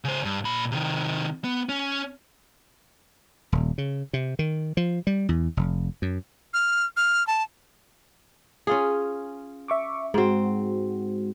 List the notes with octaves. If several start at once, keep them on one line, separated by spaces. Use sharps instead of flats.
C#3 C5
G2
A#2 B5
C3 D#3
B3
C#4
D#1
C#3
C3
D#3
F3
G3
E2
F1
F#2
F6
F6
A5
C#4 F4 G#4
E5 C#6 D6
G#2 G#3 C4 F#4